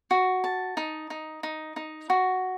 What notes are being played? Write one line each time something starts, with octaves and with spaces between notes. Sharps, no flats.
F#4
A5
D#4
D#4
D#4
D#4
F#4